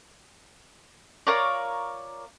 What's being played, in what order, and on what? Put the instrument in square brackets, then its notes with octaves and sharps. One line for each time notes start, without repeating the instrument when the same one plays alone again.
[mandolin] F4 A#4 C#5 D5